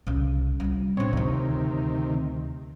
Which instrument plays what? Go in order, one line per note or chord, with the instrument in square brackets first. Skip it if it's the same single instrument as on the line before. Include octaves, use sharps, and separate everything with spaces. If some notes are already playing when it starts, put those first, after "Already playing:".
[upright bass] C2 C#3
G3 F4
[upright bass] A2 D4 [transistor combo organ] C4 C#5
[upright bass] D2 F3 [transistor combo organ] C3 D#3